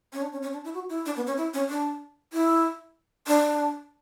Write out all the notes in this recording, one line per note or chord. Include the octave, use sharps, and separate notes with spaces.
C#4
D4
C#4
C#4
D4
E4
F#4
E4
D4
B3
C#4
E4
C#4
D4
E4
D4